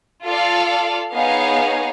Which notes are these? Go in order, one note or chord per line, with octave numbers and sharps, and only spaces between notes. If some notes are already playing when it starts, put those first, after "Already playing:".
F4 A4 D5 F5
B3 D#4 G#4 C#5 F5